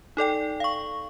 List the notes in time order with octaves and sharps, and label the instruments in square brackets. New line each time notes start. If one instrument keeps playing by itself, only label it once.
[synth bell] D#4 A4 D5 G5
F5 C#6